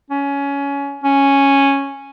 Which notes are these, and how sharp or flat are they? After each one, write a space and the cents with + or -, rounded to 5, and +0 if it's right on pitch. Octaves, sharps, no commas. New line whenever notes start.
C#4 +20
C#4 -5